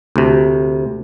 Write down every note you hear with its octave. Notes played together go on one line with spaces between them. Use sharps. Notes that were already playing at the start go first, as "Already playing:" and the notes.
D2 C3